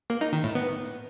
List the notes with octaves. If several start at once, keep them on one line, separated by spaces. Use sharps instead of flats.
A#3
D#4
D#3
A2
B3